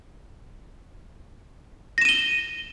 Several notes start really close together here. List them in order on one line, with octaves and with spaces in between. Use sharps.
A#6 E7 D#7 G7